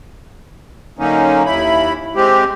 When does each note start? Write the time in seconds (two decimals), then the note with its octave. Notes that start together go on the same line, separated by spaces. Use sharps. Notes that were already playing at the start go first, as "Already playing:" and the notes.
0.99 D3 F#3 A#3 C#4 D#4
1.45 D#2 E4 B5
2.15 G#3 C4 G4